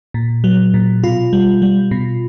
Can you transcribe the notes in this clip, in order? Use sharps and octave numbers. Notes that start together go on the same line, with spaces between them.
A#2
F#3
A#2
B2 F4
G3
G3
B2